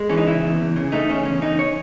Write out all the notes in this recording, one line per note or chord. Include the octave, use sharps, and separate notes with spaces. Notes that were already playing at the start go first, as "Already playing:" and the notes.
Already playing: G#3
E3 C#4
D#4
C#3 E4
E2
E2
C#3
A3 D#4
C#3 C#4
E2 C#4
E2 D#4
C#5